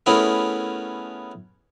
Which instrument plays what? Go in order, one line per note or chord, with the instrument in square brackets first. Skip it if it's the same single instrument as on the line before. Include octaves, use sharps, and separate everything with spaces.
[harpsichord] A3 B3 C#4 E4 G#4 A#4